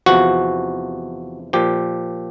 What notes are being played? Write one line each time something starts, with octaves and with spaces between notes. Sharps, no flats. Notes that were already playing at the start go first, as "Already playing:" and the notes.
E2 C3 F3 F#4
A#2 F3 G4